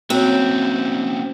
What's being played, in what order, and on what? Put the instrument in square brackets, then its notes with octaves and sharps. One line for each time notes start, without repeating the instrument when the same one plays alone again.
[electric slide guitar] A3 A#3 C#4 [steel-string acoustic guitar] C4 [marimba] F#4 C#5